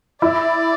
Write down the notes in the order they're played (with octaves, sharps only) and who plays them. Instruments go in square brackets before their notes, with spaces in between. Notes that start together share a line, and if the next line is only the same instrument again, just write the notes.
[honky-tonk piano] E4 [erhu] D5